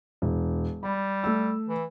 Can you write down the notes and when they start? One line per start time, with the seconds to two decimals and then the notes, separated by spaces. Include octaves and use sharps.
0.22 E1
0.83 G3 B5
1.24 A3 E6
1.69 E3